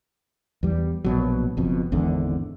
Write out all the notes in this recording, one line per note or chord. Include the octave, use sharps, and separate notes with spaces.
E2 G3
A#1 B2 F#3
F#1 F2 B2
G#1 E2 D3